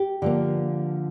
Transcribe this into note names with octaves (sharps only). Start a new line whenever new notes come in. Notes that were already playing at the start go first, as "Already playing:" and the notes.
Already playing: G4
D3 F3 A#3